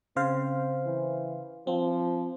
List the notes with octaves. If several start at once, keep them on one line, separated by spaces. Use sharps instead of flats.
C#3 C4 C5 F5
E3
F3 C4